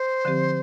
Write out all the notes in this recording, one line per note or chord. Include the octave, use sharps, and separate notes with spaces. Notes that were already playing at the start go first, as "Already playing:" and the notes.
Already playing: C5
D3 F3 C4 G4